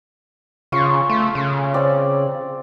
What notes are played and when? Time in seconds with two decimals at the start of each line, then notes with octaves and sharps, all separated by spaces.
0.72 C#3 F4 C6 C#6
1.10 A3
1.35 C#3
1.74 C4 D5